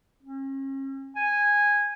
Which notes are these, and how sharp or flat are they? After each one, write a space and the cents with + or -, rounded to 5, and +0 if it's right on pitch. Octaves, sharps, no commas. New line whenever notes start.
C#4 -40
G#5 -10